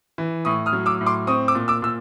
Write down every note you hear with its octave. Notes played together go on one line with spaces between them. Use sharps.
E3
A2 C#6 D#6
D#6 F6
F#3
D6 E6
A2
C6 D6
C4 C#6 D#6
D6 E6
A#2
D6 E6
A#2 E6